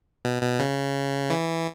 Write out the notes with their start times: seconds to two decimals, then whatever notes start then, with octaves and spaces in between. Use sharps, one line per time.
0.25 B2
0.42 B2
0.60 C#3
1.30 E3